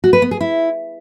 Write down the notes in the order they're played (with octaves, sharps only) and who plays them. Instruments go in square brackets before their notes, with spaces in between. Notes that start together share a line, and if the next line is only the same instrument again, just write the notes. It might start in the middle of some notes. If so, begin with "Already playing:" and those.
[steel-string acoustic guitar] F#4
B4
B3
G#4
E4